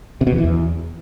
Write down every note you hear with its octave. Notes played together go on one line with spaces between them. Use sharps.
C3
B2
E2
E3
E2